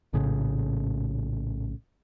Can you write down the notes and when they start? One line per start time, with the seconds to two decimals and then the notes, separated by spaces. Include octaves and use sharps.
0.13 A#1 A2 C#3